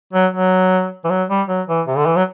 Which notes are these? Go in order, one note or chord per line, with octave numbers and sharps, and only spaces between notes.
F#3
F#3
E3
F#3
G3
F#3
E3
C3
D3
E3
F#3